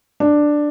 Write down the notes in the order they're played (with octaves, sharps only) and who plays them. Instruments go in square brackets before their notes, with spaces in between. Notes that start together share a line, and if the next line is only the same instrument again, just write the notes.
[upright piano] D4